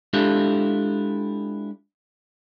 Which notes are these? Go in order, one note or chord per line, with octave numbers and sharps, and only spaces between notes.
G#3 D4 E4 F4 G4 A4